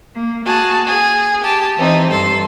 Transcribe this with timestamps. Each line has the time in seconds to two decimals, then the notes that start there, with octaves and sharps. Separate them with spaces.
0.15 A#3
0.45 A#3 F#4 G#4 A5
0.87 G#4
1.43 G4 A5
1.76 E3 C4 D#4
2.10 G2 A4 C6